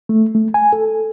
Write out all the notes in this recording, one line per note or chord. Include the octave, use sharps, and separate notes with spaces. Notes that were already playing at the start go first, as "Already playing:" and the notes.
A3
A3
G#5
A4